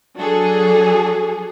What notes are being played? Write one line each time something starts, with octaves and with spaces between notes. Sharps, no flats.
F#3 D4 F#4 G#4 A4